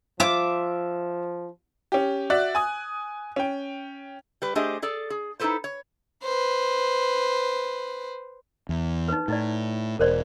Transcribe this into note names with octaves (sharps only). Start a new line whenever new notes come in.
F3 F4 E5 D6
C#4 G4
F#4 D5 E5 F#6
G#5 D#6
C#4 G5
G3 B4
A3 D4 G4 G#4 C5 D#5
G#4 A4 D5
G#4
D#4 E4 F#4 A4 B4 C5
C#5
B4 C5
E2
D#4 B4
A2 D#4 E4 D5
E1 A#4 C5 D5